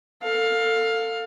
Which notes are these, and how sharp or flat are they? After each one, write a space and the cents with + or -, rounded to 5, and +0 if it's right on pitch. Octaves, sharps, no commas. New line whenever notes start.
A4 +30 F5 +15